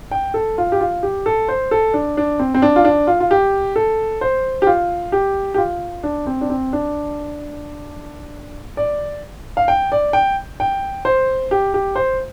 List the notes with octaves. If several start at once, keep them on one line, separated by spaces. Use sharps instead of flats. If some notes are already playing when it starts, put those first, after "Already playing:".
G5
A4
F4
G4
F4
G4
A4
C5
A4
D4
D4
C4
C4
D4
F4
D4
F4
F4
G4
A4
C5
G4
F4
G4
G4
F4
D4
C4
D4
C4
D4
D5
F5
G5
D5
G5
G5
C5
G4
G4
C5